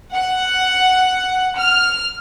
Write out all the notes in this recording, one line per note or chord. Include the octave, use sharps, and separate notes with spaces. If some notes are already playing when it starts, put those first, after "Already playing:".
F#5
F6